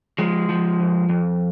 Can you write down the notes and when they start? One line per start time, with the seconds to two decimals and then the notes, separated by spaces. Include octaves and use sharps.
0.18 F3 G#3
0.49 F3
0.80 F2
1.09 F2